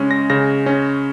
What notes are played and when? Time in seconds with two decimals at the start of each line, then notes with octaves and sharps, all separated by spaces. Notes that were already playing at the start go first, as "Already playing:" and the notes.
Already playing: C#3 G#3 C#4
0.11 A#6
0.30 C#3 A#6
0.66 C#4